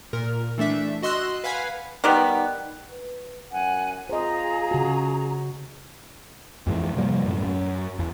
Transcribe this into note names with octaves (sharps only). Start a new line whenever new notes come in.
A#2 A#4
E3 A3 D4 E5
F#4 D#5 C6 E6 F#6
B4 F5 F#5 G#5 B5
D#3 G3 B3
B4
F#2 F#5 G#5
F4 G#4 C5 D#5 A#5
C#3 F#4
F2 G#2 E3
C3 F3 G3 A#3
F#2 A2
F#2
E2